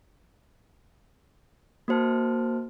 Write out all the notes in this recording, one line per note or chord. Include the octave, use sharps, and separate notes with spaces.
A#3 F#4 C5 A5 F6